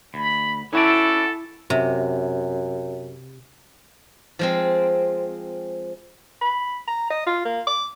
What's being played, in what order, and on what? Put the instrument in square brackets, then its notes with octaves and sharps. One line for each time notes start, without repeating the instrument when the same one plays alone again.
[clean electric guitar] D2 [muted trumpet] B5
[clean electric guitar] C#4 F#4 D5 [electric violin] E4 [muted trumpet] A4
[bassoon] F#2 [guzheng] C3
[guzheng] F3 G#3 C4
[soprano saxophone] B5
A#5
D#5
F4
A#3
D6